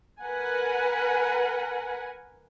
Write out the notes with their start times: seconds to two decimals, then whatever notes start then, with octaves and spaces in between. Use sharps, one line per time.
0.22 A#4 B4 F#5 G#5